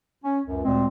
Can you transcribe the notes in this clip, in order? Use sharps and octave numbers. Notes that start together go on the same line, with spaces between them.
C#4
C#2 F#2
D2 A#2 G#3 C4